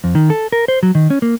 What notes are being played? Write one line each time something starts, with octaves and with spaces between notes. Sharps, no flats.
F2
D#3
A4
A#4
C5
F#3
D#3
C#4
A#3